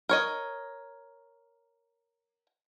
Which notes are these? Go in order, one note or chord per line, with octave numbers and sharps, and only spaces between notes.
A#4 C#5 D#5